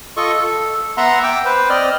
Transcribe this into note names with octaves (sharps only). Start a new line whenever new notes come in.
F4 A4 D#5 C#6
A4
B3 E5 F#5 A#5 C6
G5 D6 E6
B4 C5
C4 D5 D#5 F6